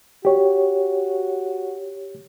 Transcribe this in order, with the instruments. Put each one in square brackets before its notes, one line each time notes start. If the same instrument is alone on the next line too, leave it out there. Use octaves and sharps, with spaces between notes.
[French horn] F#4 [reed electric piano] G4 C#5